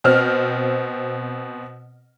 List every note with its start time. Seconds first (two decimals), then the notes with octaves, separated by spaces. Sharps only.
0.04 B2 C4 F6